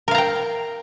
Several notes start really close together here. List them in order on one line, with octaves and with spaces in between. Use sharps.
A#4 F5 A#5 G5